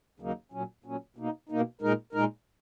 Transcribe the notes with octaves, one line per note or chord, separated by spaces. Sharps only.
D#2 C#3 F#3 A#3 D#4
A#2 F#3 C#4
A#2 F#3 C#4
B2 A#3 D#4
B2 A#3 D#4
A#2 G#3 D#4 A#4
A#2 G#3 D#4 A#4